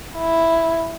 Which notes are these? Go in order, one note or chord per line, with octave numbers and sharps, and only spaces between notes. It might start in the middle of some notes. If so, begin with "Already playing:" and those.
E4